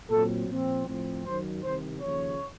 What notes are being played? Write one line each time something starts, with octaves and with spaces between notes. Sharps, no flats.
A#2 F#3 C4 A4
A#2 F3 C4
A2 F3 C4
F#2 D#3 F#3 C5
C2 C3 D#3 C5
D#2 C#3 F3 C#5